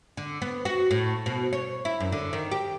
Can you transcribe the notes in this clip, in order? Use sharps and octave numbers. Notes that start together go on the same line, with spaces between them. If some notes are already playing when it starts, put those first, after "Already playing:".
D3
B3
F#4
A2
B2
C#5
E4
F#2
D3
D#3
G4